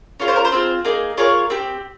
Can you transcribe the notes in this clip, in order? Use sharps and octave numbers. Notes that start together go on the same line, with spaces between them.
C#4 F4 G#4 C#5
C5
A#4
C5
C4 F4 G#4
A#3 D#4 G#4
A#3 F4 G#4 C#5
C4 G4